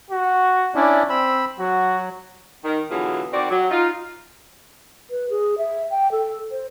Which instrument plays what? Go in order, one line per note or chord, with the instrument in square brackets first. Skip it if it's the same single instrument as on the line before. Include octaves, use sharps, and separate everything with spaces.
[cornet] F#4
[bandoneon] C#4 D4 E4 [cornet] D5
[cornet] C4 [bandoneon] B5 E6
[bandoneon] F#3 [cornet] F#4
[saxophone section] D#3
B2 D3 E3 F#3 F4 G#4
D#3 C4 F#4 D5
F#3
D#4 F4
[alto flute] B4
G#4
E5
G5
A4
C5